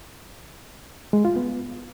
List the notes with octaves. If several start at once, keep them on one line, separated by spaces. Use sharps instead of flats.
G#3
F4
B3